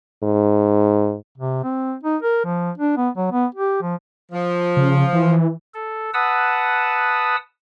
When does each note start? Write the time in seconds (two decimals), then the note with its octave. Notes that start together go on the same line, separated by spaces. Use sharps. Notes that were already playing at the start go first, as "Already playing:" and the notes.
0.23 G#2
1.38 C3
1.64 C4
2.04 D#4
2.23 A#4
2.45 F3
2.78 D4
2.97 B3
3.17 F#3
3.32 B3
3.55 G4
3.82 F3
4.32 F3
4.77 C#3
5.13 E3
5.74 A4
6.14 B4 F#5 A5 D#6 E6